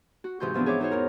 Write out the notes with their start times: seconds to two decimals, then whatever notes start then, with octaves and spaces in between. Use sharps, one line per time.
0.24 F#4
0.40 G#2 C3 E3 F#4 C6 G6
0.54 E3 F3 B3 C4 D4
0.66 G#4 C#5 E5 D6
0.80 D#4 E4 F#4 G#4 C5 C#5
0.91 E2 A#4